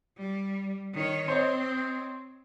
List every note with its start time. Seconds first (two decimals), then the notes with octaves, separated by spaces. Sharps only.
0.17 G3
0.93 D#3 C#5
1.28 C4 C5 C#5 D#5